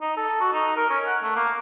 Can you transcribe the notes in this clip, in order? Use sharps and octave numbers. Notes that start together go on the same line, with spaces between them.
D#4
A4
F#4
D#4
A#4
C#4
F#5
A3
A#3